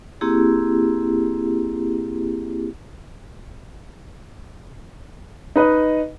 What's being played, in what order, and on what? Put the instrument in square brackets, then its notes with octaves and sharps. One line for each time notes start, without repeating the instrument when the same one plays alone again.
[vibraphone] A#3 C4 E4 G4 G#4
[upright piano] D#4 B4 D#5